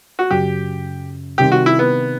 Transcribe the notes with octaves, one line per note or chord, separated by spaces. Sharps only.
F#4
F#2 C#3 F#3 G4
C3 D#3 G3 C4 G4
F#4
E4
B3